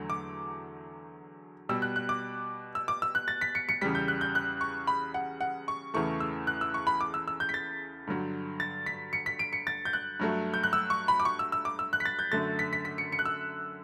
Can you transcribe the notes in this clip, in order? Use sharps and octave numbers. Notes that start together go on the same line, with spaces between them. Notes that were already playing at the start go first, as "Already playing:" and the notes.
Already playing: E2 D3 F#3 A3
D6
B2 G3 E6
F#6
F#6
D6
E6
D6
E6
F#6
A6
B6
C#7
C#7
E2 C#3 G3 B6
G6
F#6
G6
F#6
C#6
B5
F#5
F#5
C#6
E2 C#3 E3 A3 C#6
E6
F#6
E6
C#6
B5
D6
E6
E6
G6
B6
A6
G2 D3 F#3
A6
B6
C#7
B6
D7
C#7
A6
G6
F#6
G2 F#3 A3
G6
F#6
E6
C#6
B5
D6
C#6
E6
E6
D6
E6
F#6
B6
A6
G6
F#2 D3 A3 A6
B6
B6
B6
C#7
C#7
F#6
E6